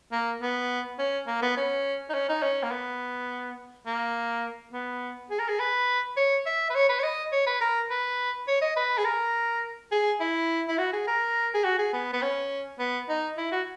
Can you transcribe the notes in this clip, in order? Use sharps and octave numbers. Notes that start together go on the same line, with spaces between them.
A#3
B3
C#4
A#3
B3
C#4
D#4
C#4
D#4
C#4
A#3
B3
A#3
B3
G#4
A#4
G#4
B4
C#5
E5
B4
C#5
B4
C#5
D#5
C#5
B4
A#4
B4
C#5
D#5
B4
G#4
A#4
G#4
E4
E4
F#4
G#4
A#4
G#4
F#4
G#4
B3
B3
C#4
B3
D#4
E4
F#4